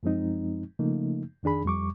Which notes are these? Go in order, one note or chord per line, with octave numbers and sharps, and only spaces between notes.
F#2 F3 G#3 C4 D#4
C#3 F3 A3 A#3 D#4
F2 D#3 D4 G#4 B5
F2 G3 C#6 D6